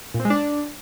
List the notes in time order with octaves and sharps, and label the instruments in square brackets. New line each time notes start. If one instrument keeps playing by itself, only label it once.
[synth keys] A#2
C4
G#3
D4